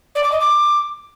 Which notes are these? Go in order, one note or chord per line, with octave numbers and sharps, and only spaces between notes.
D5
D6
D#5
D6